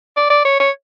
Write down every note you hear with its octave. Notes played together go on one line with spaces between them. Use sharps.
D5
D5
C#5
C#5